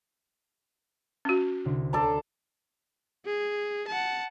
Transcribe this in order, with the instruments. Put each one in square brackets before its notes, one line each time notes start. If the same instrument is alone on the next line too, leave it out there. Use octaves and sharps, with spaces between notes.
[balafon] C#4 F#4
[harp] C2 D3
[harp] D2 C#5 C7 [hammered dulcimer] A4 D5 A#5
[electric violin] G#4
F#5 A5